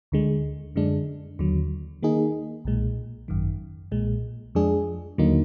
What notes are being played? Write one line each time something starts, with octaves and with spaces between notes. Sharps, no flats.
D2 D3 G#3
F#2 D3 G#3 D4
D#2 D3 F#3
D#3 A#3 D#4 G#4
B1 A#2 G#3
G#1 F#2 D#3
B1 A#2 G#3
F2 F3 G#3 D4 G#4
D#2 D3 F#3 A#3 D#4